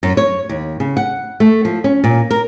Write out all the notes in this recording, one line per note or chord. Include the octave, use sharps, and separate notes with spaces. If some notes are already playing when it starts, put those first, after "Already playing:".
F#2
C#5
D#2
C#3
F#5
A3
F3
C#4
A#2
A#4